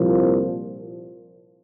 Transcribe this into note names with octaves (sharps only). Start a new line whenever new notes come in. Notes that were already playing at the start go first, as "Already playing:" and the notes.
Already playing: C2 A#2 F3